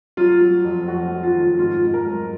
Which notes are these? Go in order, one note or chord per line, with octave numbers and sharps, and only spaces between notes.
F#3 F4
F#3
F2
F2 F#4
F#3
F4
D#3
G#2 F4
G#2
A#4
F#3